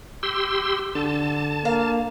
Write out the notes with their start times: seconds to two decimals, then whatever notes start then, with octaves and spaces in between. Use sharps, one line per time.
0.23 G4 C6 E6
0.95 D3 A5
1.65 A#3 F5